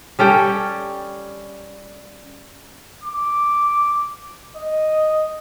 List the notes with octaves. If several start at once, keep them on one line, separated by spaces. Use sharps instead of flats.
G3 C#4 A4 G5
D6
D#5